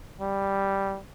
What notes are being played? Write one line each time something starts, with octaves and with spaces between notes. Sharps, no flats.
G3